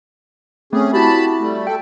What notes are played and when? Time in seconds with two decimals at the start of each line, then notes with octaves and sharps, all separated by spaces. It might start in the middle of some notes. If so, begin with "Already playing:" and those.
0.73 A3 C4 C#4 G#4
0.93 E4 F#4 G4 A5 B5
1.40 G3 A3
1.67 A4 G5